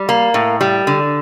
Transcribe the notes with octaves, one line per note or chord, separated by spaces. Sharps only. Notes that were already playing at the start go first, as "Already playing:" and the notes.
Already playing: G3
A#3
A2
G3
D3